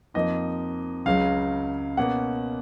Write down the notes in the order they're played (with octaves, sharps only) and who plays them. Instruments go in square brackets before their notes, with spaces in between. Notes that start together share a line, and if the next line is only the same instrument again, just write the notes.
[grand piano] F2 F3 A#3 D#4 D#5
C#2 C#3 F#3 F5
B2 A#3 C#4 F#5